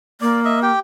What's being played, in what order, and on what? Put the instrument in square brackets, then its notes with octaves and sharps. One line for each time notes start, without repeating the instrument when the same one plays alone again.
[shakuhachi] A#3 [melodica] D5
[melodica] D#5 E5
G4 G5